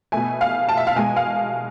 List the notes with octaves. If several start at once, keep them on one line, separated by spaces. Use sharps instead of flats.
B2 A3 G#5
F5
A5
E5
F5
B2 G#3 G#5
F5